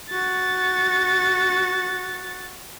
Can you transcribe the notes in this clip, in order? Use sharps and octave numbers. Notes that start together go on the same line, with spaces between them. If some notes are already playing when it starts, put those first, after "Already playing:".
F#4 A6